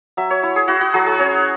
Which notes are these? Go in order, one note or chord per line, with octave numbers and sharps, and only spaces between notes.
F#3 E5
C#5
E4
G#4
E4 F#4
F#4
F#3 G#4
G#4
C#4 C#5